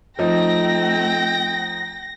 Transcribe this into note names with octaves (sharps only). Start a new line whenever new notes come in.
F3 A3 C4 D#4 G5 A#6